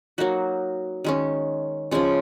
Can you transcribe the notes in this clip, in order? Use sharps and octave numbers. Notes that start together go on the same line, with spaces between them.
F#3 A#3 D#4 F#4
D#3 G#3 C#4
C#3 F3 G#3 C#4